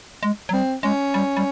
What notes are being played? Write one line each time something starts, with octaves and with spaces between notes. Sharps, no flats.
G#3
F#3
G3 C4
G#3 C#4
G3
G3